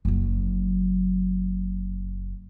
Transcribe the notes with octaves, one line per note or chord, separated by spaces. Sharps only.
F#1 F#3